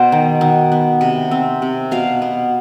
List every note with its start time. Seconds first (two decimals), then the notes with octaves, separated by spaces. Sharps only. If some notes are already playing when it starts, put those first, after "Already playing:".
Already playing: B2 B3 C5
0.12 D#3
0.41 D#3
0.72 B3
1.01 C3
1.31 C4
1.62 C3
1.91 B2 F5
2.22 B3